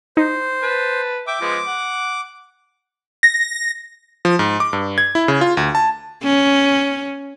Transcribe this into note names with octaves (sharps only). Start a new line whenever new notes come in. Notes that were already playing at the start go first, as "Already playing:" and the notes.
D#4 C5
B4 A5
E5 G5 D6
F3 G#3 B3
F#5
A#6
F3
G#2
D6
G2
G#6
E4
C#3
F4
D2
A5
C#4